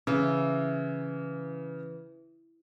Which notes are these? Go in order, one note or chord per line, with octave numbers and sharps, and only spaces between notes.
C#3 E3